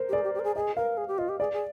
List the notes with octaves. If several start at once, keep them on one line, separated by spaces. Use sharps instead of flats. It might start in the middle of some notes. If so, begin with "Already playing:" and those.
Already playing: A#4 C5
G4
G#4 D5
G4
G4
A#4
G#4
G#4 D#5
A#4 F5
G#4
G4
F4 D#5
G4
G#4 D5
G#4